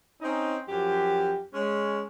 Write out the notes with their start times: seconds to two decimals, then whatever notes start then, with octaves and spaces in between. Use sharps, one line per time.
0.21 C4 C#4 D#4
0.68 F#2 F3 G4
1.54 G#3 C#4